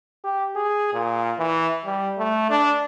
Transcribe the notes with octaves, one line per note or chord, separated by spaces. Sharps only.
G4
G#4
A#2
E3
G3
A3
D4